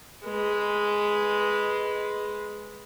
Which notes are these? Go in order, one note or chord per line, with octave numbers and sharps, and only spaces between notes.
G#3 B4